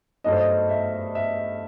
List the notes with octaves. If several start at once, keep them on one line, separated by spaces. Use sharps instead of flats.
G2 F#3 A3 D#4 D#5
C5
D#5
E5
E5